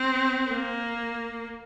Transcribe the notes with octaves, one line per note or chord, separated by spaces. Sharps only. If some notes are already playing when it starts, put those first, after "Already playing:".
Already playing: C4
A#3